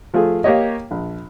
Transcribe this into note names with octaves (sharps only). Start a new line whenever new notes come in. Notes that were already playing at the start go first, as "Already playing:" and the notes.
F3 A3 F4 G#4
A#3 G4 C#5 D#5
A#1